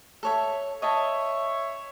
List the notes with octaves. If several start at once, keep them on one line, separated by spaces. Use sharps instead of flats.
A4 C#5 E5
C#5 D#5 E5 G5 A5